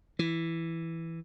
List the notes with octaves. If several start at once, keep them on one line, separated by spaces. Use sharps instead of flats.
E3